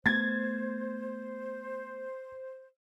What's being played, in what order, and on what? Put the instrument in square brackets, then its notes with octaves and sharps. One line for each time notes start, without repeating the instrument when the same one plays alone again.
[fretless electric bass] A3 B3 [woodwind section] C5 [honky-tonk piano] G#6 A6